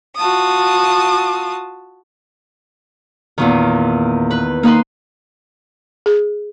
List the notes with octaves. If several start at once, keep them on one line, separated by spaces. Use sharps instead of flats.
F4 F#4 A5 D#6
E2 A#2 D#3
B4
A#3 D#4 B4 C6
G#4